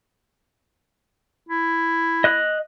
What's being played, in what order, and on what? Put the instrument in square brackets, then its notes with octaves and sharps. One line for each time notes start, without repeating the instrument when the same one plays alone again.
[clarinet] E4
[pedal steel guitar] D#5 F#6